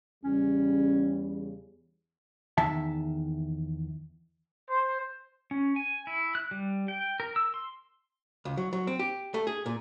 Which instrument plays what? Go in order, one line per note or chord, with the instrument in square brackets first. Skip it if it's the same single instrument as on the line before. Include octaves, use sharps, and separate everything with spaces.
[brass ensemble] E2 C#3 G3 [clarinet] C#4
[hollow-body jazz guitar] E2 D#3 E5 A5
[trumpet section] C5
[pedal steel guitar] C#4
G#5
E4
F#6
G3
G5
A#4
E6
C6
[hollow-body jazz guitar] C#2
F#3
F#3
C4
G4
A3
G#4
A#2